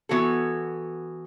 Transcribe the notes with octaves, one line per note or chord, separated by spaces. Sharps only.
E3 B3 F#4 A4